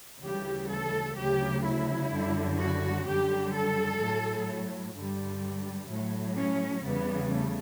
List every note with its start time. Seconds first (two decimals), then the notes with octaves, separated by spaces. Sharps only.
0.21 D2 C#3 E3 G3 G4
0.69 A4
1.16 D2 C#3 F#3 G4
1.64 E4
2.11 F#2 D3 G3
2.58 F#4
3.05 F#2 D3 G3 G4
3.53 A4
3.99 A2 F#3
4.94 G2 D3 G3
5.88 A2 F#3
6.36 C#4
6.83 E2 C#3 G3 B3
7.30 A3